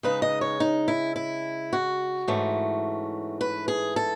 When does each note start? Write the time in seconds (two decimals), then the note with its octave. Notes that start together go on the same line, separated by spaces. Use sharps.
0.03 C#3 G#3 D#4 B4
0.22 D#5
0.41 C#5
0.60 D#4
0.88 E4
1.16 E4
1.73 F#4
2.28 G#2 E3 A3 C#4
3.41 B4
3.68 G#4
3.96 A4